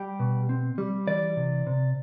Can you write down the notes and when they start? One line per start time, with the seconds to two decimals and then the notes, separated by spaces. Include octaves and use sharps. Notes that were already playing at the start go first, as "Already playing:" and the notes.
Already playing: G3 G5
0.19 B2
0.49 C4
0.78 G3
1.07 E3 D5
1.37 C3
1.67 C3